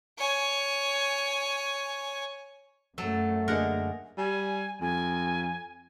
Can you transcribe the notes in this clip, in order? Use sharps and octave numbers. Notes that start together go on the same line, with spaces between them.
C#5 G#5
F#2 F#3 A3 A4
D3 A#3 G#4 A#4 D#5 F#5
G3 G#5
F2 G#5